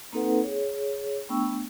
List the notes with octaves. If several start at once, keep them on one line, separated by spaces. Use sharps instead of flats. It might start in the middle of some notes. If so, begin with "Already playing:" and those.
A#3 C4 D#4 A4 B4 F#5
G#4 C#5
A3 B3 D4 G5 C#6 E6